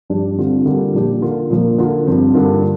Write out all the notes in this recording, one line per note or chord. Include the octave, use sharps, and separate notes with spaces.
G2 F3 D4 G4
D3 G3 C4 F4
D3 G3 A#3 F4
A#2 F3 D4 G4
D3 A#3 F4
A#2 F3 A#3
D3 A#3 F4
G2 F3 C4
G2 D3 A#3 F4